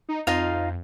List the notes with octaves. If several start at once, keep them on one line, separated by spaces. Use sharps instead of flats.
D#4
F2 D#4 F4 F5